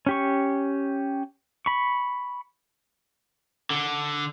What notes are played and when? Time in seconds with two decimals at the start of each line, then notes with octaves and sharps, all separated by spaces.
0.06 C#4 G4 C#6
1.66 B5 C#6
3.70 D3